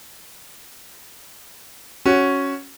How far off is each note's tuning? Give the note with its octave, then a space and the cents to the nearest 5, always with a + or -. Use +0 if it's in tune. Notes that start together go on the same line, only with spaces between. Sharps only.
C#4 +0 F#4 +0